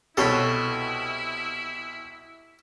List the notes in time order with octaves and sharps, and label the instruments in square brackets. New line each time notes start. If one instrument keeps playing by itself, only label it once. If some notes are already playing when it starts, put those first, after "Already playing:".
[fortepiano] C2 B2 [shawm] E4 [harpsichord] A4 C#5 B5